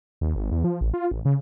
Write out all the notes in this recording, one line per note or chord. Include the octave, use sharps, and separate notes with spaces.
D#2
G#1
E2
F3
A1
F4
A1
C#3